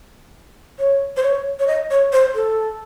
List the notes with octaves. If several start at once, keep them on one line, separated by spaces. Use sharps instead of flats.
C#5
C5
C#5
C#5
D#5
C#5
C5
A4